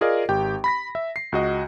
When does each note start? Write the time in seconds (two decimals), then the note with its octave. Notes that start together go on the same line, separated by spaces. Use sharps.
0.01 F4 G#4 A#4 D5 D#5 F5
0.29 G#1 G4 G5
0.64 B5 A#6 B6
0.95 E5
1.16 C7
1.32 C#2 F#4 D#5